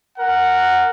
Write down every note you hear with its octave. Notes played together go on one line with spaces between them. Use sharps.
A#4 F#5